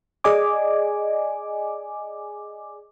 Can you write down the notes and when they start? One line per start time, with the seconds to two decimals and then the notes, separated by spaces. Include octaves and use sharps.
0.24 G#4 D5 D#5 G#5 D6